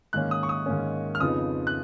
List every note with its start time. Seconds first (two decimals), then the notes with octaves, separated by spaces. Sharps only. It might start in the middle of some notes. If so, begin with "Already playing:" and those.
0.13 G#2 D#3 A#3 C#4 F#6
0.31 D#6
0.43 C#6
0.49 D#6
0.66 G#2 D#3 A#3 C#4
1.15 F6
1.19 F2 C#3 F3 B3 D#4 D#6
1.67 F#6